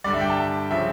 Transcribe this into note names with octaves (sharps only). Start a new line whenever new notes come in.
G2 D3 G3 D5
E5
G5
A5
C#3 F3 E5